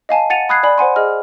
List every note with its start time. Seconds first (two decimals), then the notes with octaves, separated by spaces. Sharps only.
0.09 D#5 F5 G#5 A5
0.30 F#5 A6 C#7 D#7 F7
0.49 B5 D#6 F#6 G#6 C7
0.63 D5 G#5 B5
0.78 C5 F#5 G#5 C6
0.96 G#4 D#5 F6